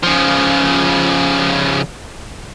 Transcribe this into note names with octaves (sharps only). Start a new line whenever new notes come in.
C#3 F3